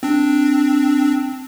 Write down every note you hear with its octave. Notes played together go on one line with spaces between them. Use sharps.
C4 D4